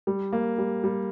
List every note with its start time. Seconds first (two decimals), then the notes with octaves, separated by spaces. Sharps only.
0.07 G3
0.33 A#3
0.58 G3
0.84 G3